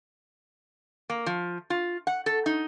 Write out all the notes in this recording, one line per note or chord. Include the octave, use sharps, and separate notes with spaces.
A#3
F3
F4
F#5
A4
D#4